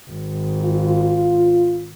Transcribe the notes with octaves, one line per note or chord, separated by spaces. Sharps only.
G#1
F4